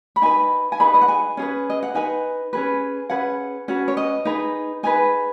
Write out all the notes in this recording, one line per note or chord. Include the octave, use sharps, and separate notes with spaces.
B5
D#4 B4 G#5
G#5
D#4 G#4 B4 B5
D#5
F#5
G#5
C#4 G#4 B4
D#5
F#5
D#4 B4 G#5
C#4 G#4 B4
C#4 G#4 B4 F#5
C#4 F#4 B4 F#5
C#5
D#5
D#4 G#4 B4
D#4 G#4 B4 G#5